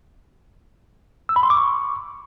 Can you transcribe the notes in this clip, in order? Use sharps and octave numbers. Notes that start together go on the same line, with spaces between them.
E6
B5
C6
D6
C#6